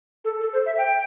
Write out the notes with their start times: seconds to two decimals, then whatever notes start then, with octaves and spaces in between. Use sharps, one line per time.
0.25 A4
0.41 A4
0.53 C5
0.66 E5
0.78 G5